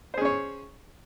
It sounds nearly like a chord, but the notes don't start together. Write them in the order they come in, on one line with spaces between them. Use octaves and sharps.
C5 G#4 C#4 C#5